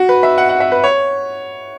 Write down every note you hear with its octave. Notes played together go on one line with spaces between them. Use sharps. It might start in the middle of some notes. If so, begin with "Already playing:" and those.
Already playing: F#4
B4
E5
F#5
F#5
E5
B4
C#5